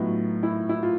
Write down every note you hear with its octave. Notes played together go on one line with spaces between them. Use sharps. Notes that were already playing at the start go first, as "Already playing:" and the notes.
Already playing: A2 F#3 B3 D#4 F4
E4
E4
F4